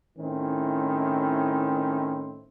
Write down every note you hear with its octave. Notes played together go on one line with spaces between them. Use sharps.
A2 D#3 C4 C#4 E4